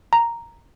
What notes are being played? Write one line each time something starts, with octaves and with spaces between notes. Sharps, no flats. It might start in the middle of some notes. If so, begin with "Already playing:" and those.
A#5